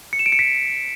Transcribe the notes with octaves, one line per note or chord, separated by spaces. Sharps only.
C#7
E7
D7
C#7
B6